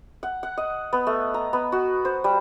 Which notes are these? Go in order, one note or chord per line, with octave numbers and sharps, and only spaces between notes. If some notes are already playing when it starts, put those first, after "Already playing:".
F#5
F#5
D#5
B3
A3
A#5
B3
F#4
C5
G3